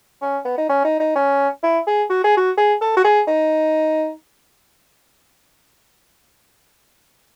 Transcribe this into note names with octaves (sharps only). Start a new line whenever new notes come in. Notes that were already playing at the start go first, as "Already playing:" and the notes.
C#4
B3
D#4
C#4
D#4
D#4
C#4
E4
G#4
F#4
G#4
F#4
G#4
A4
F#4
G#4
D#4